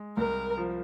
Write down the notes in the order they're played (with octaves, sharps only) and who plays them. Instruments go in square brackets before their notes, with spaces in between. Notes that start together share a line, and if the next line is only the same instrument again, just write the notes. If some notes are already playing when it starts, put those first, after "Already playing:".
Already playing: [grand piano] G#3
[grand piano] C2 [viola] A#4
[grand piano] F3